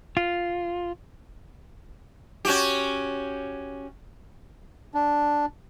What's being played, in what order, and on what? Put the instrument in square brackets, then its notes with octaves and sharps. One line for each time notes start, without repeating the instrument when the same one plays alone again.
[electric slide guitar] F4
[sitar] C#4 F#4 G4
[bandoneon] D4